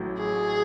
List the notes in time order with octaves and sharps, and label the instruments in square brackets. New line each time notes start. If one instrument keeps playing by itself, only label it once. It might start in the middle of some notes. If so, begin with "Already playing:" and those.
Already playing: [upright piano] A1 A2 F#3
[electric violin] G#4